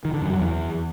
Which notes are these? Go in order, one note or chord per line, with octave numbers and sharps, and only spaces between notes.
D#3
D3
F#2
F#3
E2